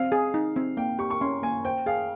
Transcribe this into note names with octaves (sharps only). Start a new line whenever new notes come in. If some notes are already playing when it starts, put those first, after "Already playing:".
Already playing: C4 F5
G#4
D#4
C4
A#3 G5
G4 C#6
C#6
C#4 C6
A#3 G#5
C5 G5
G#4 F5